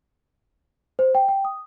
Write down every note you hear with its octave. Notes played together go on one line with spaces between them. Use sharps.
C5
G5
G5
D#6